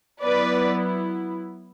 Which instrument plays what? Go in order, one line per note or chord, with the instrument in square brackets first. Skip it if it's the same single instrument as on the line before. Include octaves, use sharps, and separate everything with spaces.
[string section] F#3 B3 E4 B4 D5